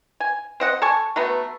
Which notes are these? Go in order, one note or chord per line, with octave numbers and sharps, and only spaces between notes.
G#5
C4 D#5 F#5
A4 G#5 C#6
F#3 A3 B3